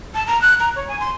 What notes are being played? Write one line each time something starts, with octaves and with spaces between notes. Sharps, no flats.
A5
A#5
F#6
A#5
C#5
G#5
C6